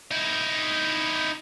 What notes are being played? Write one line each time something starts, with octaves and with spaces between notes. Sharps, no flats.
D#4 E4